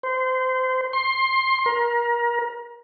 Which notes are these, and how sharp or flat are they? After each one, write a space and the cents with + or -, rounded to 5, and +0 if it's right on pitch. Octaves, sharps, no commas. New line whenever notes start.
C5 -25
C6 +20
A#4 +30